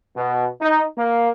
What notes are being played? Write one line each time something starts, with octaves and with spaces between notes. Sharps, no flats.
B2
D#4
A#3